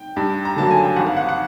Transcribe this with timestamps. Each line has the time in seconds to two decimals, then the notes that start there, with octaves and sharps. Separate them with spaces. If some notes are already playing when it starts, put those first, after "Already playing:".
Already playing: G5
0.16 G2
0.45 A#5
0.56 D3 F#3 A#3 A5
0.71 G#5
0.83 G5
0.96 G#1 F#5
1.07 F5
1.16 F#5
1.29 F#5